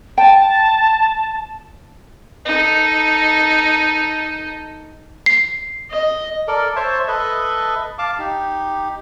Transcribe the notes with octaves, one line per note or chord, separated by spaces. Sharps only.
G5 A5
D#4 A4
C7
D#5
A4 A#4 D5
C5 C#5 E5 A5
A4 B4 D#5 E5
F5 A5 D6
D#4 G4